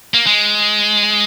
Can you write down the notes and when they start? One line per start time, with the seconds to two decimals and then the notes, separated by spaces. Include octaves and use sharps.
0.14 A#3
0.26 G#3